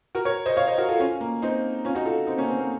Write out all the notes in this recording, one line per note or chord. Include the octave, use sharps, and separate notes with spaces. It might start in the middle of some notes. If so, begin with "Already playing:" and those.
F#4 A#4
A#4 C#5
C5 D#5
C#5 F5
C5 D#5
F#4 A#4
F4 A4
C#4 F4
A#3
C4 D#4
C#4 F4
D#4 F#4
F4 A4
C4 D#4
A#3 C#4
C4
A#3